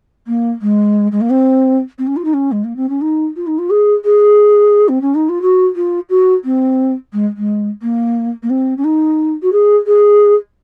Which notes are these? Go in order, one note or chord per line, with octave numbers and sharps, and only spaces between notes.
A#3
G#3
G#3
A#3
C4
C4
C#4
F4
D#4
C#4
G#3
A#3
C4
C#4
D#4
F4
D#4
F4
G#4
G#4
C4
C#4
D#4
F4
F#4
F4
F#4
C4
G#3
G#3
A#3
A#3
C4
C#4
D#4
F#4
G#4
G#4